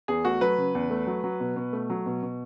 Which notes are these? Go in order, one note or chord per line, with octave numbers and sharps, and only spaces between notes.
E2 G#4
A3 F#4
F#3 B4
C#3
E2
A3
F#3
F#3
B2
B2
A3
F#3
B2
B2